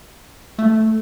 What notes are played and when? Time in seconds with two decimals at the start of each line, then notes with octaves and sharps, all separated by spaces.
0.59 A3